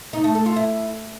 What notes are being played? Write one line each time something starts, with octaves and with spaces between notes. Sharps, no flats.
D#4
A3
A4
F4
E4